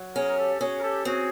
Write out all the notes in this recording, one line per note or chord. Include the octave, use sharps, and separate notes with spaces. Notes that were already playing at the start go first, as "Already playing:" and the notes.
Already playing: F#3
C#4 G#4 A#4
A#4
G4 A4
C#4 F#4 G#4
A#4
G4 A4
C4 F#4 G#4